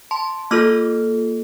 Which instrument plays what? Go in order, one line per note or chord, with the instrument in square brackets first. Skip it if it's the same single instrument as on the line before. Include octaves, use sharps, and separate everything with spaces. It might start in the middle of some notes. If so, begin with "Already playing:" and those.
[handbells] A5 C6
A#3 F4 A4 D6 F6